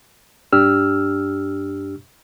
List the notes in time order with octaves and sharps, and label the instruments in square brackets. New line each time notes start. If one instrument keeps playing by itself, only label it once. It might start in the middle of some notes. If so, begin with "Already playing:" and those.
[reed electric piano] G2 D4 G4 E6 F6